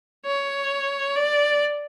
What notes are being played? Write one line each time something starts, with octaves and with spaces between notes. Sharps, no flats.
C#5
D5